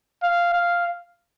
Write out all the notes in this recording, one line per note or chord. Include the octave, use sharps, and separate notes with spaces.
F5
F5